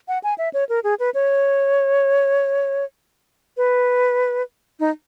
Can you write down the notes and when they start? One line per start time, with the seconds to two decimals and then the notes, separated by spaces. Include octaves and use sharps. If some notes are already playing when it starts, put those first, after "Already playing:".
0.08 F#5
0.23 G#5
0.38 E5
0.54 C#5
0.69 A#4
0.84 G#4
1.00 B4
1.14 C#5
3.57 B4
4.80 D#4